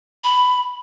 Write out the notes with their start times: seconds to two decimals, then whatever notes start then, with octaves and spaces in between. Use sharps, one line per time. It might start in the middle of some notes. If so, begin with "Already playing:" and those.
0.24 B5